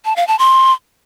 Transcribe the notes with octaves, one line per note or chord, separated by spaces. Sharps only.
A5
F5
A5
C6